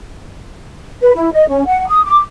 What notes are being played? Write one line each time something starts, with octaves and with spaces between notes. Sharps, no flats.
B4
E4
D#5
C#4
F#5
D#6
D6